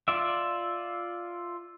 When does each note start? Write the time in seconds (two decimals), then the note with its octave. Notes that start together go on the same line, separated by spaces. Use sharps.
0.08 F4 D5 E5